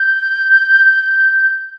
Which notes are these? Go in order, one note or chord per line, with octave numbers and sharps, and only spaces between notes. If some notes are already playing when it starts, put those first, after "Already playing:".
Already playing: G6